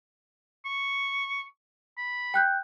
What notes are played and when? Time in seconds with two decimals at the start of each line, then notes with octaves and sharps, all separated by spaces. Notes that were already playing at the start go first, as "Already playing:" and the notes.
0.65 C#6
1.98 B5
2.34 G5 F#6 G6